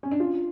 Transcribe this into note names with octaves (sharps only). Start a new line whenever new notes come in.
C#4
D4
F4